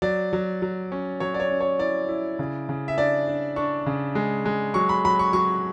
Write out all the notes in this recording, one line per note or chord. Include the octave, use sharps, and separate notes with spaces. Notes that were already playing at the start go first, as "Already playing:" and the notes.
F#3 D5
F#3
F#3
C#4
F#3 C#5
D5
C#5
C#4
C#5
E4 D5
E4
C#3
C#3
E5
D4 D5
D4
D4 C#6
C#3
G#3
G#3
F#3 C#6
B5
F#3 B5
C#6
F#3 C#6